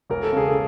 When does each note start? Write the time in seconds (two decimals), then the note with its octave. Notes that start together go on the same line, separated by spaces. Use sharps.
0.10 E1 A#4
0.23 A4
0.32 C#3 G#4
0.50 A4